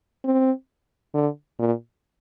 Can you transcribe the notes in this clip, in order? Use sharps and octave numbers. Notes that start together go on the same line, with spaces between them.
C4
D3
A#2